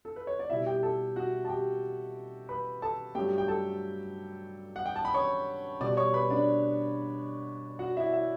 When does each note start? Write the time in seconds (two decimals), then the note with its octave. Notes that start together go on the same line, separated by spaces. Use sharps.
0.05 A4
0.16 B4
0.27 C#5
0.39 D5
0.50 B2 G3 E4 E5
0.66 G4 G5
0.83 A4 A5
1.16 F#4 F#5
1.45 A5
1.49 G4 G5
2.49 B4 B5
2.82 A4 A5
3.15 G2 F#3 A3 G4 G5
3.38 G5
3.48 A4 A5
4.76 F#5
4.86 G5
4.96 A5
5.05 B5
5.14 C#5 C#6
5.81 B2 G3 D5 D6
5.97 C#5 C#6
6.14 B4 B5
6.30 D4 D5
7.79 F#4 F#5
7.97 E4 E5
8.13 E4 E5